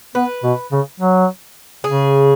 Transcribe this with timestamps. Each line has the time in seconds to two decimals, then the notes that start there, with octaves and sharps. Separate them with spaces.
0.15 B3 B4
0.43 B2
0.72 C#3
1.00 F#3
1.84 C#3 G#4